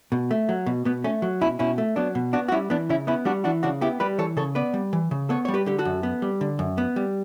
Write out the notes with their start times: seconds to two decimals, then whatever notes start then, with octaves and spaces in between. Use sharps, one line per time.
0.12 B2
0.31 A3
0.49 F#3
0.66 B2
0.85 B2 B3
1.04 A3 C#4
1.22 F#3
1.41 B2 C#4 E4
1.59 B2 C#4 E4
1.78 A3
1.96 F#3 B3 D4
2.15 B2
2.33 B3 D4 F#4
2.48 F#4
2.52 G3 C#4 E4
2.70 E3 B3 D4
2.89 C#3 C#4 E4
3.07 B3 C#4 E4
3.25 G3 D4 F#4
3.44 E3 D4 F#4
3.63 C#3 D4 F#4
3.81 B3 E4 G4
4.00 G3 G4 B4
4.18 E3 A4 C#5
4.37 C#3 A4 C#5
4.55 B3 B4 D5
4.74 G3
4.93 E3
5.11 C#3
5.29 B3 A4 C#5
5.45 G3 C#5
5.54 G4 B4
5.66 D3 G4
5.79 F#4 A4
5.85 F#2
6.03 B3
6.22 G3
6.41 D3
6.59 F#2
6.78 B3
6.96 G3